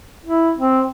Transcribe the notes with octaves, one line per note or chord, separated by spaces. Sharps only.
E4
C4